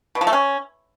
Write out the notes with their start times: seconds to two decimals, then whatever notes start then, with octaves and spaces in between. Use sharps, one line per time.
0.15 B2
0.21 F3
0.27 A3
0.33 C#4